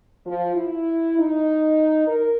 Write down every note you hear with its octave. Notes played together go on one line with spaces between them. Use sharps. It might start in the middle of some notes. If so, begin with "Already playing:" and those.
F3
E4
D#4
A#4